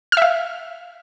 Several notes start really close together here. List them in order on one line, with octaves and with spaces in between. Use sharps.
F6 E5 F5